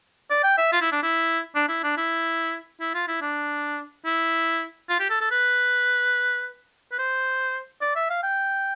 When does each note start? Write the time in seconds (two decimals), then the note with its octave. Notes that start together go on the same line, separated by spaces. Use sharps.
0.30 D5
0.43 G5
0.57 E5
0.72 F4
0.81 E4
0.92 D4
1.03 E4
1.55 D4
1.69 E4
1.83 D4
1.97 E4
2.81 E4
2.94 F4
3.08 E4
3.21 D4
4.05 E4
4.89 F4
5.00 G4
5.10 A4
5.21 A4
5.31 B4
6.92 B4
6.99 C5
7.81 D5
7.96 E5
8.10 F5
8.23 G5